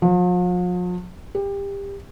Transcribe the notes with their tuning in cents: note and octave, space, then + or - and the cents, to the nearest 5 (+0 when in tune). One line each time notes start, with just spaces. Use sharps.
F3 +45
G4 +25